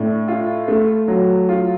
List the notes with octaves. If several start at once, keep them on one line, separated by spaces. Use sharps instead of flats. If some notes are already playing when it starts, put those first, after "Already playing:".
Already playing: A2 D4
F4
A3
F#3
F4